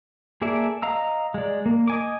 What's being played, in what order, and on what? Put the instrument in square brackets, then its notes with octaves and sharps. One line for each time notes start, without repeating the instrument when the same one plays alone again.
[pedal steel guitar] A#3 G#4 A4 D5 E5
D#5 F5 A#5 E6
G#3 D5
A#3
D#5 G#5 D6